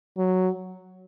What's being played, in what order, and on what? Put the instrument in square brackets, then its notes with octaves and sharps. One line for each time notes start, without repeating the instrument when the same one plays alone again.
[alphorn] F#3